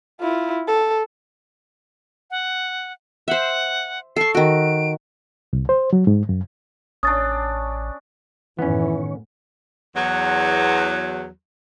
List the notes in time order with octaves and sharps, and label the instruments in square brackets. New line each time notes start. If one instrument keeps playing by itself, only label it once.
[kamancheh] E4 F4
A4
[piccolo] F#5
[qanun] C5 E5 [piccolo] F#5
[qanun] A4 C#6 [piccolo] C7
[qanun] D#3 F#4 [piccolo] D7
[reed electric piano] C2
C5
F#3
G#2
F#2
[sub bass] A1 [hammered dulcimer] C#4 D4 [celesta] D#6 A6
[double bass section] F#2 A2 [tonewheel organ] D#3 C#5 [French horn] E3 [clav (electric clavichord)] B3 C#4
[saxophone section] E2 F#3